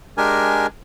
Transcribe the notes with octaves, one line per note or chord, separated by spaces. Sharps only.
G#3 D4 G4 A#4 G#5